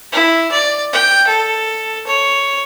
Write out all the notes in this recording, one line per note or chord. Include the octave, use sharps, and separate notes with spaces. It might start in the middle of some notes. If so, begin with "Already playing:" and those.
E4
D5
G5
A4
C#5